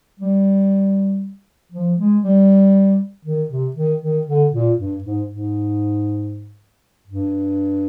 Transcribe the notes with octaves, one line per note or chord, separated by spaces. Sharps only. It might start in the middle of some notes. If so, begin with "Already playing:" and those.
G3
F3
G#3
G3
D#3
C3
D#3
D#3
D3
A#2
G2
G#2
G#2
G2